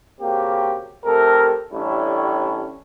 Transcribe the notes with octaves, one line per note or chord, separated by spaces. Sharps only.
C#3 A#3 C4 F#4 G4
C3 A3 G4 A4 A#4
A1 A2 G3 C#4 D4 E4